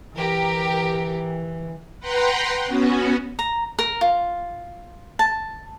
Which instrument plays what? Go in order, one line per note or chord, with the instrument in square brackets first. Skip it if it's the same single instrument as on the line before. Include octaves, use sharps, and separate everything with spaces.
[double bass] E3 [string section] G4 A#4
[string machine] B4 F#5 G5 A#5 C6
B3 C#4 F#4
[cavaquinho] A#5
A#4
F4
A5